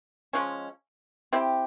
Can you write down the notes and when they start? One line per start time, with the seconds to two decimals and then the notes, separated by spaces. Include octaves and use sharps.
0.33 F3 G#3 C#4
1.33 C4 E4 G4